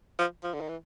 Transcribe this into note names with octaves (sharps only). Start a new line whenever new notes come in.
F3
F3
D3
D#3
E3